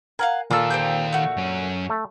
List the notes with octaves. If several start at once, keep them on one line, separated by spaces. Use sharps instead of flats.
A#4 F5 F#5 G#5
A#2 D#3 F4 A4 F5 E6
C4 G4 G6
A3 F#4
F#2 C#4
A3